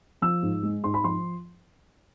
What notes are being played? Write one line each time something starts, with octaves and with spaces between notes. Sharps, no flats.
F3 E6
G#2
G#3
G#2 C6
B5
F3 C6